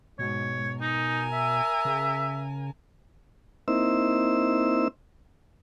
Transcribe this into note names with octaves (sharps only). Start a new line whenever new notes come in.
G#2 B2 C#5
D#4 A#4 G#5
E5
C#3
A#3 C4 D#4 E4 C5 E6